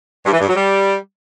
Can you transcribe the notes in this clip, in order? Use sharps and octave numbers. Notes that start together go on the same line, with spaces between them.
G2
E3
G2
F#3
G3